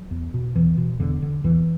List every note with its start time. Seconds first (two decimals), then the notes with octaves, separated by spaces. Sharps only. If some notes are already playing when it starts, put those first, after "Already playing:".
Already playing: F#3
0.11 E2
0.34 B2
0.56 E2 E3
0.77 B2
1.00 E2 D3
1.22 D3
1.44 E2 E3